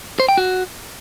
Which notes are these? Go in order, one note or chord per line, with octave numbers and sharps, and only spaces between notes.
C5
G5
F#4